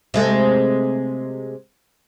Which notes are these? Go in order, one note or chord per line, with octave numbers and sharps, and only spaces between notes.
C3 G#3 A3